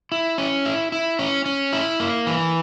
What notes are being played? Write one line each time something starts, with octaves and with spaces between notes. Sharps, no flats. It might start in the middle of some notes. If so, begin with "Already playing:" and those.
E4
C#4
E4
E4
C#4
C#4
E4
A#3
E3